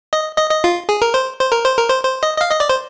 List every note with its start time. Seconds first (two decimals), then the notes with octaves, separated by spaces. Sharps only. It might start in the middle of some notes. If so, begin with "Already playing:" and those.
0.13 D#5
0.38 D#5
0.50 D#5
0.64 F4
0.89 G#4
1.02 A#4
1.14 C5
1.40 C5
1.52 A#4
1.65 C5
1.78 A#4
1.90 C5
2.03 C5
2.23 D#5
2.37 D#5
2.41 F5
2.51 D#5
2.60 D5
2.69 C5